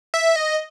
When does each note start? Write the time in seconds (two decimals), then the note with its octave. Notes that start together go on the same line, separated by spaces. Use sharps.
0.14 E5
0.36 D#5